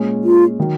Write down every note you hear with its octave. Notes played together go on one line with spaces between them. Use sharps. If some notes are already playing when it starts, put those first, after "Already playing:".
Already playing: A#2 G#3 C#4
F4
D#3 F#3